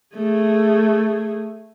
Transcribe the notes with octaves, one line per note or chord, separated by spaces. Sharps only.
A3 G#4